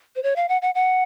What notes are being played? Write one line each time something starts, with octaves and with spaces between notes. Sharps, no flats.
C5
C#5
F5
F#5
F#5
F#5